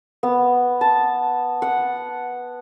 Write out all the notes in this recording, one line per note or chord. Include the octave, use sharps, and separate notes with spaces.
B3
A5
F#5